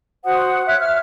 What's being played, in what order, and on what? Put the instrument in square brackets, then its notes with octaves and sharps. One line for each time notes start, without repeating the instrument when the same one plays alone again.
[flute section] F#4 C5 F#5 D#6
C#5 E5 F#6
E5 F6